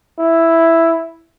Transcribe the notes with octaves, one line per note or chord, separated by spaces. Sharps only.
E4